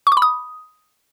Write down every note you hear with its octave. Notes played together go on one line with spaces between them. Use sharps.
C#6
D6
B5
D#6